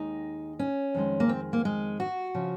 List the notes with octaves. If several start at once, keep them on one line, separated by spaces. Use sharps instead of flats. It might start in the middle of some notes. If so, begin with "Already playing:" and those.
Already playing: D#2 D#3 G#3 D#4
C#4
F2 D#3 G#3
A#3
C4
A#3
G#3
F#4
C#3 F3